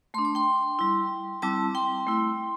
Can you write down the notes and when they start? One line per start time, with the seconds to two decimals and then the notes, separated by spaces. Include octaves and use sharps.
0.14 A3 D4 C6
0.25 D6
0.35 G5 C6
0.79 G3 E4
1.42 G3 C4 E4 A5 D6
1.75 G5 C6
2.07 A3 E4